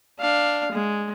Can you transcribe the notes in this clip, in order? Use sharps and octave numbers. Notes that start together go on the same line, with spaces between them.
D4 F5
G#3